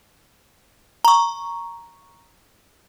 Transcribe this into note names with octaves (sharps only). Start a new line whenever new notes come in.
A#5 C#6